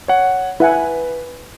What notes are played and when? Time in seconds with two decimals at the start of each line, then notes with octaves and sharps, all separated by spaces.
0.08 C#5 F#5
0.60 E4 B4 F#5 G#5